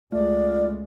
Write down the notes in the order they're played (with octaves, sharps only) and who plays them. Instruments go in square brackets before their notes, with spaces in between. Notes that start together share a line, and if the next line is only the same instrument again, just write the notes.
[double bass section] C#2 G#3 [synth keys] A3 [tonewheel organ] F4 [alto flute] D5